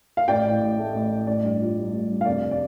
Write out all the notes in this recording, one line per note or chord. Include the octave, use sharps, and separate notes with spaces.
F5
A1 D5 G5
A2
A1
A3
A1
A2
A1 D5
G2
F4
G3
A1
G2
F5
F1 D5
D5